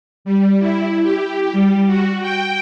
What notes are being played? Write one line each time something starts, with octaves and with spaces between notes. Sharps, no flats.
G3
E4
G4
G3
F#4
G5